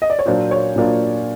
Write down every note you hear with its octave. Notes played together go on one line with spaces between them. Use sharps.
D#5
D5
C#5
A#2 F#3 A#3 D4 F4 C5
C#5
A#2 F#3 A#3 D4 F4